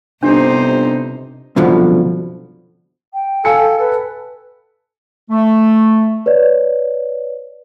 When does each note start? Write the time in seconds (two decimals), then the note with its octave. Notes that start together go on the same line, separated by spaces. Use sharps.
0.23 G1 C3 D4 D#4 C5
1.56 C2 F#2 B2 D3 F3
3.13 G5
3.45 A4 F5 G#5 C#7
3.78 A4 B4
5.30 A3
6.26 B4 C#5 D5